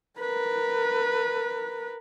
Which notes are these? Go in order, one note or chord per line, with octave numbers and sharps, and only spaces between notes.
A#4 B4